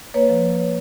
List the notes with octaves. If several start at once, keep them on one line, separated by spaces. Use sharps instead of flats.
A#3 B4 C#5
F3